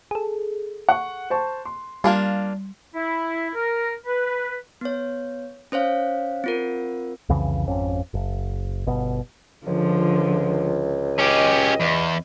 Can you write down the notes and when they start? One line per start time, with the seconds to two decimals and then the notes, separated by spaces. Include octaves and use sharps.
0.11 G#4 A4
0.89 F#5 C#6
1.30 C5 A5 C#6
1.65 C6
2.04 G3 A#3 D4 F4
2.95 E4
3.55 A#4
4.06 B4
4.81 B3 C#5
5.72 C#4 C5 C#5 F5
6.44 C4 F4 A#4
7.29 C2 F2 C#3 E3
7.67 G#1 F2 C#4
8.14 F#1
8.87 G1 B2
9.66 C#2 D3 F3
11.19 C#4 G4 D#5
11.81 E2